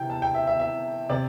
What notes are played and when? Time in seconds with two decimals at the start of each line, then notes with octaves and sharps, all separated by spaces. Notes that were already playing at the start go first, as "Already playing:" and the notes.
Already playing: C3 E3 G5
0.10 A5
0.22 G5
0.34 E5
0.47 E5
0.59 E5
1.09 C3 D5